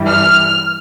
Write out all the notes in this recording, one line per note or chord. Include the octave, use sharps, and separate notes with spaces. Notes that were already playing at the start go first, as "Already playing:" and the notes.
Already playing: G2 E3 G3
F6